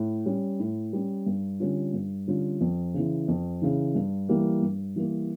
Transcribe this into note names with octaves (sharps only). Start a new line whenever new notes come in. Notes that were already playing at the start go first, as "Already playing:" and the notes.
Already playing: A2
G3 C#4
A2
G3 C#4
G2
D3 G3 C#4 F4
G2
D3 G3 C#4 F4
F2
C#3 E3
F2
C#3 E3
G2
E3 G3 A#3
G2
E3 G3 A#3